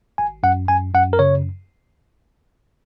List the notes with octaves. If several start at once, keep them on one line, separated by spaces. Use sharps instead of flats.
G#1 G#5
F#2 F#5
F#2 G#5
F#2 F#5
A#4
C#3 C#5